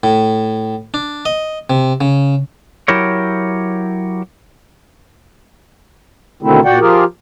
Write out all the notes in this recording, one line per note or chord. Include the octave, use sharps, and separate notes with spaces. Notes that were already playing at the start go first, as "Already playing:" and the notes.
A2
D4
D#5
C3
C#3
F#3 E4 G4 A#4 C#5
B2 D3 D#3 A3 C4 E4
A#2 F#4 D5 F#5 G5
F3 F4 G4 G#4 A#4